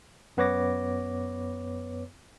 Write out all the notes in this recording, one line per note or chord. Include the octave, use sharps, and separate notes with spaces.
F#2 B3 B4 C#5 D6 A#6